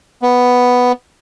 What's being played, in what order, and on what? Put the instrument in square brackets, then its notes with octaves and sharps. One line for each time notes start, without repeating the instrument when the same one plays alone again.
[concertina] B3